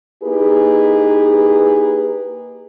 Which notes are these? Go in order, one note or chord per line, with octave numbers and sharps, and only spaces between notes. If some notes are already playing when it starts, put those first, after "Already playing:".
A#3 D#4 E4 G4 G#4 B4